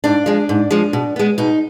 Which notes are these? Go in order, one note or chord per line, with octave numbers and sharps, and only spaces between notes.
G#2 D4
F3 G#3
G#2
F3 G#3
B2
G#3 B3
B2 D#4